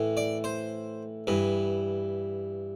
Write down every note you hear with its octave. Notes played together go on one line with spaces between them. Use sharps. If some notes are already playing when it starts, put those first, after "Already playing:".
Already playing: A2 E3
D5
C5
G2 E3